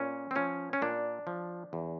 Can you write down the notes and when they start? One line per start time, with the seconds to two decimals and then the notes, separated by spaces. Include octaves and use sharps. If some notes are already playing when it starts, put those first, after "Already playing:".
Already playing: A#2 C#4
0.31 C4
0.35 F3 C#4
0.73 C#4
0.82 A#2 D4
1.27 F3
1.73 E2